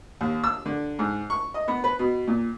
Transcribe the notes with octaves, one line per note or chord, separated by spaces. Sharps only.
D#2
E6
D3
G#2
C#6
D#5
B3
B4
B2
A#2